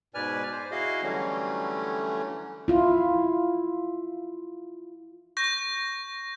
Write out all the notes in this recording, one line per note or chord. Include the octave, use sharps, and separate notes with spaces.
G#2 B2 B4 D5 G#5 F6
C5
E4 F#4 G#4 D#5 F5
D3 E3 F#3 G3 A3 C#4
E4 F4
C#6 G6 A#6